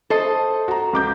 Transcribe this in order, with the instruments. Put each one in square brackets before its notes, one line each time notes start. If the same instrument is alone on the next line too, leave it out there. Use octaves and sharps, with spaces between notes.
[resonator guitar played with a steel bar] A4 C5 D#5
[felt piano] F#4 A#5
C#2 D6 G6